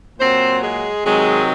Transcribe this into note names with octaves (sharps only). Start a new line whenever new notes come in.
A#2 F#3 C4 C5
G#3 G#4
C3 D#3 F#3 G#3 G#4